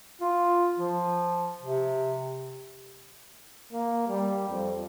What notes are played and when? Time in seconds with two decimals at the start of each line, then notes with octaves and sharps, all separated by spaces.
0.21 F4
0.78 F3
1.62 C3
3.72 A#3
4.08 G3
4.49 F2